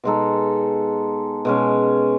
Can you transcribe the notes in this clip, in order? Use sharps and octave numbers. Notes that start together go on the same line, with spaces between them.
B2 G#3 D#4 A4
B2 G#3 C#4